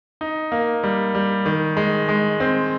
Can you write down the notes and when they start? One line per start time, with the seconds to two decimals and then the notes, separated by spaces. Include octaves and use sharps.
0.21 D#4
0.52 A#3
0.83 G3
1.15 G3
1.46 D#3
1.77 G#3
2.09 G#3
2.40 C4